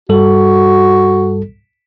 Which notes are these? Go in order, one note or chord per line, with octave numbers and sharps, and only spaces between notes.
G2 G3 F#4 A4